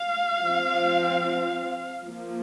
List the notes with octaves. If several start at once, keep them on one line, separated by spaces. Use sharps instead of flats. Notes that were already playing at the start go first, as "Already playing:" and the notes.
Already playing: F5
F3 C4
F3 A#3